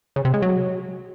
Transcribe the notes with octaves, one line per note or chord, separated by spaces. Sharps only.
C#3
C3
G#3
F#3